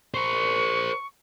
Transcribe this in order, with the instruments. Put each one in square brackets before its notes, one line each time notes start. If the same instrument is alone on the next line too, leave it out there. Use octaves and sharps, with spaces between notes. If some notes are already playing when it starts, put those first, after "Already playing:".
[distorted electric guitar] A#4 C5 [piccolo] C#6